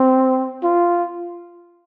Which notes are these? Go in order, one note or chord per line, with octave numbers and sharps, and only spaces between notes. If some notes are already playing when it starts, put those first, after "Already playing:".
Already playing: C4
F4